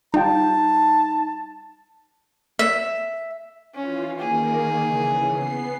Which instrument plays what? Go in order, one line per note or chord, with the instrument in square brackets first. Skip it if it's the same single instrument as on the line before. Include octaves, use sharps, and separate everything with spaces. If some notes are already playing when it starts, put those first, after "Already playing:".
[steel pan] G3 F4 G5 [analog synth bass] D#4 [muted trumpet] A5
[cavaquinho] E5
[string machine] E3 F4 [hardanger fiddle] C#4
[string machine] D#3 A#3 [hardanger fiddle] G#4
[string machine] C#3 E3
B3 C7